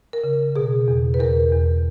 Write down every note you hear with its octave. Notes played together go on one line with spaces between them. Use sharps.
A#4
C#3
B2 G#4
E2
B4
E2 A#4
E2